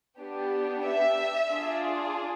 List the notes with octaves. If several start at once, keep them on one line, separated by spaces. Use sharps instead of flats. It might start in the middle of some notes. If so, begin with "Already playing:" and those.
B3 D4 G4
E5
D4 F4 G#4